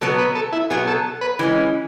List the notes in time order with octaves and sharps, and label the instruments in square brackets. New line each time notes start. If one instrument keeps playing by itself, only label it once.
[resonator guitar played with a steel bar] B2 F#3 B3 [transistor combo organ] A4
[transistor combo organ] B4
A4
E4
[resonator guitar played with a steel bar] B2 F#3 B3 [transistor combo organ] G#4
[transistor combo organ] A4
B4
[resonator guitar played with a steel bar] E3 G#3 C#4